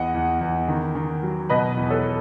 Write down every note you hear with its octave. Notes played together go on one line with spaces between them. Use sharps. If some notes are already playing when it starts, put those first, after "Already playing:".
Already playing: E2 D#5 F#5
E2
E2
D#3
D#3
F#3
B2 B4 D#5
E2
A4 C#5